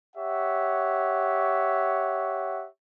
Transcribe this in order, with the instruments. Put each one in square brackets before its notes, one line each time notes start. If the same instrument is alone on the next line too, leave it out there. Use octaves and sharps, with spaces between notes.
[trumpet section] G4 C#5 E5 F#5